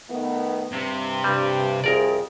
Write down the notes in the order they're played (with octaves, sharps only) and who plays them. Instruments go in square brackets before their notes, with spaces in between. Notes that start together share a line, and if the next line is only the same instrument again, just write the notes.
[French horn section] D#3 A3 B3
[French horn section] G2 [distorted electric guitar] C3
[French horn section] G2 [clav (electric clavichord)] G3
[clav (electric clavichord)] C2 A#4 D5 [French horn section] F2 [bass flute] G#4